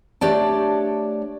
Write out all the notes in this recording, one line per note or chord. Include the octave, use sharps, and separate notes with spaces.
A3 D4 G4 C#5 D5 A5